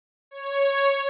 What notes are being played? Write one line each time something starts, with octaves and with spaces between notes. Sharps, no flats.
C#5